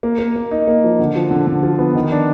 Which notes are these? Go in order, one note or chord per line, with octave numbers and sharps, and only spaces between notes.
A#3
A#3
A#3
D#4
A#3
F3
D3
F3
D3
D3
F3
B3
D#3
D4